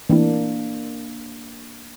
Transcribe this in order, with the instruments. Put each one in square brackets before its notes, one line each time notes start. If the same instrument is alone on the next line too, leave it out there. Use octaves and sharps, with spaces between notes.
[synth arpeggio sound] E3 A3 C4 E4 [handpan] A#3 D4